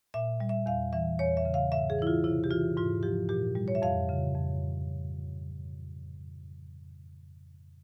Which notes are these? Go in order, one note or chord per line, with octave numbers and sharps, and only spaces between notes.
A#2 E5
G3
E5
E2 F5
E3 E5
E2 C#5
E5
C#3
F5
G#2 E5
G#4
E3 E4
F4
C3 E4
G4
E3 F4
G#2 F4
F3 G4
A#2 G4
G3
C#5
E5
F2 F5
C#3
F2